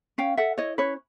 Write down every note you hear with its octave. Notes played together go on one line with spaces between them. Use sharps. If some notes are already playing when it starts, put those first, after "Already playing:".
C#4 F5 G5
A4 E5 F#5
E4 C#5 D#5
C#4 B4 C#5